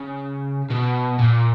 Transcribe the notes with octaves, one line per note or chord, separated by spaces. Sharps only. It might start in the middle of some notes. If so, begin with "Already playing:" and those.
Already playing: C#3
B2
A#2